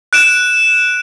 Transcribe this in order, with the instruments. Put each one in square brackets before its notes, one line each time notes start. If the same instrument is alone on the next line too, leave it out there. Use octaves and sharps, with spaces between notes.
[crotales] F#6 D7 E7